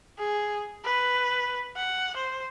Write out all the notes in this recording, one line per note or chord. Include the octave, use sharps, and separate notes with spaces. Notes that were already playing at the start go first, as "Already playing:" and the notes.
G#4
B4
F#5
C5